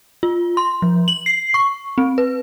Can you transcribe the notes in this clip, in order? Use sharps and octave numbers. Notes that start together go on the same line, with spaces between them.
F4
C6
F3
F#7
C7
C#6
C4
B4